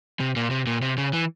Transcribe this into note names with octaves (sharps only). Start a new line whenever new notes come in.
C3
A#2
C3
A#2
C3
C#3
E3